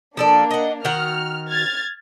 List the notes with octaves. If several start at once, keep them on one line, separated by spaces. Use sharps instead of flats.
F3 A#3 D4 A4 D5
D#5 F#5
D#3 F#4 F#5 F6
F6 G#6 A6